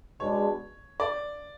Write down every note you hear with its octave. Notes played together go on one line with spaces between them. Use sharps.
B2 G#3 D4 C#5
D5